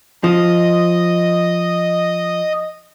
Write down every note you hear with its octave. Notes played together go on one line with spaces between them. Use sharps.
F3 D#5